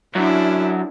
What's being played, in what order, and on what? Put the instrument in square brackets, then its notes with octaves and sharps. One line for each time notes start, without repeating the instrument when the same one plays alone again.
[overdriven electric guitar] F#2 [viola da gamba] D4 E4